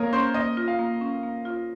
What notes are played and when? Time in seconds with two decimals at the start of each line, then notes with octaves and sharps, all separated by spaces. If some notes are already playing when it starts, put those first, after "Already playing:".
Already playing: A#3 A#4 C#5 D#5 F5
0.13 C#4 C5
0.34 A#3 D#5
0.57 F4
0.68 F5
0.79 A#3
1.01 C#4
1.23 A#3
1.45 F4